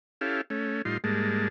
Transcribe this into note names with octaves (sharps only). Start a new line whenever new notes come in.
C#4 E4 G4 A4 F5
A3 C#4
A2 G3 D#4 F4 C6
G#2 G3 G#3 A#3 A5